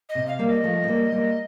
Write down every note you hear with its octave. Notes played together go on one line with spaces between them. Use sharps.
D#5
C3
F5
G3 A#3
F5
D#5
F3 A3
C4
G3 A#3
G3 A#3